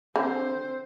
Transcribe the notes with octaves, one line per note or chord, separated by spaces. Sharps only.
D3 C4 C5